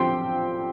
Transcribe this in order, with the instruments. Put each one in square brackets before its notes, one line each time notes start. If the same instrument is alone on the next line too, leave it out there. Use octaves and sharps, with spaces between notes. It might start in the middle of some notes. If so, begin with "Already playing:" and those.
Already playing: [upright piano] D3 F3 C4 F4 G4 C5 G5 C6